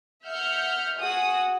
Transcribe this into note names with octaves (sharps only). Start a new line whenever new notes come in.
E5 F#5 F6 G6 C#7
F#4 G#4 F#5 D#6